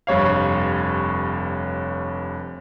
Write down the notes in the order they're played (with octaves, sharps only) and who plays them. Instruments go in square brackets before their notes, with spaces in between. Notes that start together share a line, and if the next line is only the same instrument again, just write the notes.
[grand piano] F1 G2 C#5 F5